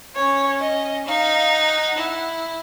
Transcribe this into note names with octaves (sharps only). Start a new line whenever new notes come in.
C#4 C#5
D#5
D#4 F5
F#5
E4